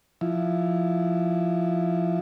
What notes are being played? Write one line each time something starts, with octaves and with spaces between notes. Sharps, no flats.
F3 E4